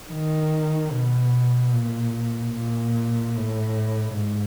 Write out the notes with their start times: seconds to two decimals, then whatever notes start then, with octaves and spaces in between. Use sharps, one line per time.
0.11 D#3
0.91 B2
1.73 A#2
2.55 A#2
3.36 A2
4.17 G#2